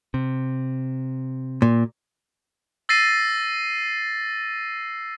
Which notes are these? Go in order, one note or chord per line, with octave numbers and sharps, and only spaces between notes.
C3
A#2
E6 A6 A#6 C7 D#7